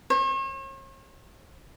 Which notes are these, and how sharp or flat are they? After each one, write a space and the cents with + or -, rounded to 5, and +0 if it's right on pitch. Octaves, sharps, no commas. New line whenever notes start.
C#5 -45